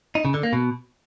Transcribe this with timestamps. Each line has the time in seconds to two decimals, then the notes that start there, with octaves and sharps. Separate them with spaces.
0.15 D#4
0.25 C#3
0.34 D3
0.43 A#3
0.53 B2